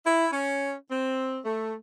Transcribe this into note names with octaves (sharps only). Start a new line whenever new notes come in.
E4
C#4
C4
A3